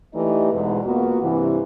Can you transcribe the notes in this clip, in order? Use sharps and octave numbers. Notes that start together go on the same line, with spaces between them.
E3 A3 D#4 G4 D5 D#5
E2 G#2 B2
A#3 B3 F4 F#4
G2 C3 E3